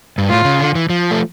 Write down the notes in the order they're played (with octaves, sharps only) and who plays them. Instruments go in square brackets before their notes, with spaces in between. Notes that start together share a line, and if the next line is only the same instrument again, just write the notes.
[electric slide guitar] G2
[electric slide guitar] A2 [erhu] F4
[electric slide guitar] C#3
D3
E3
F3
A3